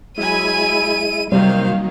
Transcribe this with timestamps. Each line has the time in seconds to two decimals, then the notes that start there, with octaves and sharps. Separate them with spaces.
0.18 F#3 G#3 E4 G#5 B5 D#7
1.32 C3 D#3 F#3 G3 A#3 C5 F5